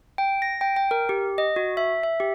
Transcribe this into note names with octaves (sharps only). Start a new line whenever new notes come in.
G5
A#6
G5
G5
A#4
G4
D#5
F#4
E5
E5
G4